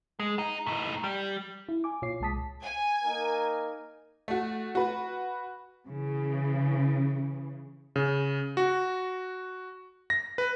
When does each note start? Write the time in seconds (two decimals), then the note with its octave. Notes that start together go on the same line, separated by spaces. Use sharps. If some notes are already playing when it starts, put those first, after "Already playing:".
0.20 G#3
0.39 D#4
0.66 A2 D#4
1.04 G3
1.69 E4
1.84 G#5 D6
2.02 A#2 F4 C#5 D6 C7
2.20 C2 A#2 G#3 A5 D#6 B6
2.62 G#5
3.05 A#3 D#4 A#4
4.28 A3 F#4
4.75 F#4 B4
5.87 C#3 E3
7.96 C#3
8.57 F#4
10.10 A#6
10.38 B4